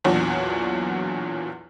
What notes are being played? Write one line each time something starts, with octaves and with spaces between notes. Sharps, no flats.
B1 E2 A#2 F#3 D4 F#4